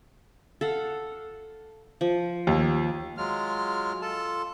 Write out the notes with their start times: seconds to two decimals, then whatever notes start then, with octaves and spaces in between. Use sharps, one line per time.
0.61 A4 F5 F#5
2.01 F3
2.47 D#2
3.17 F#3 G#3 F4 F6
4.02 F4 A4 A5